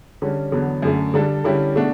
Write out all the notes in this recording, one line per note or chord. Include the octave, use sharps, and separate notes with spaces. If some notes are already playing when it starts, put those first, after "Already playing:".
D3 G3 C#4
E2 D3 F#3 B3
F#2 D3 A3
D3 G3 D4 A4
D3 G3 C#4 E4 G4
B2 A3 D4 F#4